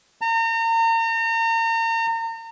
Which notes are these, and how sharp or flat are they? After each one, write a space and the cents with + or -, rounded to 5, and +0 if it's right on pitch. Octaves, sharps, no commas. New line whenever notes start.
A#5 -35